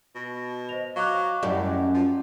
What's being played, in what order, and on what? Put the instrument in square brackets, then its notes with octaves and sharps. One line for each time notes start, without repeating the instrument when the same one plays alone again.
[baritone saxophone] B2
[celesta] C5 D#5 F7
[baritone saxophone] F#3 [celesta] F5 D6 F#6
[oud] F#2 G4 D5 [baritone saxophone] A2 [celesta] D#5 F#5
[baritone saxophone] F3